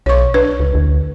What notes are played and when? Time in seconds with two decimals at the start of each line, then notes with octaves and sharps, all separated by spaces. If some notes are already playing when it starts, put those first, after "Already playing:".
0.06 B1 C#5 C#6
0.34 D4 B4
0.60 C#2
0.75 D2